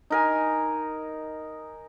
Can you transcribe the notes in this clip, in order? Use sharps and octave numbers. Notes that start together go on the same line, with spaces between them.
D#4 A#4 G#5